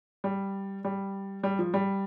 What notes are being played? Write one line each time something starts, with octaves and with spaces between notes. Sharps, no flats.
G3
G3
G3
F3
G3